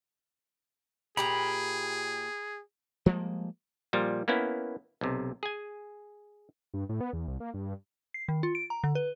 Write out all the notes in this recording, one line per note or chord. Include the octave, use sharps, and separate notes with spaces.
A#2 G4 G#4 A#5 B5
F3 G3 G#3 A#3
A#2 F3 G3
A#3 B3 C#4 E4
B1 C3
G#4 G#5
G2
A2
B3
E2
C2
A#3
G2
C7
D#3
F4
D7
A#5
D3
B4